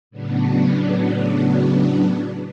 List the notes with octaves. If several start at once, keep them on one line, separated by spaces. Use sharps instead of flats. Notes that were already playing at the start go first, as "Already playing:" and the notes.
A2 C#3 F#3 B3 D4